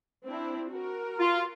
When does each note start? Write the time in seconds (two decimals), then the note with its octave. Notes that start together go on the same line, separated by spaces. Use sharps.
0.25 C4 D4 E4
0.68 F#4 A#4
1.19 F4